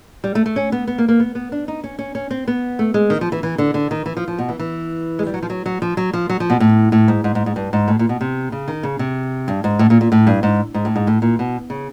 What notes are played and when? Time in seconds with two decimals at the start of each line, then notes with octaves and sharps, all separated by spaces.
0.24 G3
0.35 A3
0.46 A3
0.56 C#4
0.72 B3
0.87 B3
0.98 A#3
1.08 A#3
1.20 B3
1.35 B3
1.52 D4
1.68 D#4
1.84 C#4
1.99 C#4
2.15 C#4
2.31 C4
2.48 B3
2.79 A3
2.94 G#3
3.10 D#3
3.21 F3
3.32 E3
3.43 E3
3.58 D3
3.74 D3
3.91 D#3
4.06 E3
4.17 F3
4.28 F3
4.38 B2
4.49 E3
4.59 E3
5.19 G#3
5.27 G3
5.34 F#3
5.43 F3
5.50 F#3
5.66 F#3
5.82 F3
5.97 F#3
6.13 F3
6.30 F#3
6.40 F3
6.50 B2
6.60 A2
6.92 A2
7.08 G#2
7.24 G#2
7.35 G#2
7.46 G#2
7.56 G2
7.73 G#2
7.88 A2
7.99 A#2
8.09 B2
8.21 C3
8.52 C#3
8.68 D#3
8.83 C#3
8.99 C3
9.48 G2
9.64 G#2
9.79 A2
9.90 A#2
10.01 A#2
10.12 A2
10.27 G2
10.43 G#2
10.74 G#2
10.85 A2
10.96 G#2
11.07 A2
11.22 A#2
11.39 B2
11.70 C#3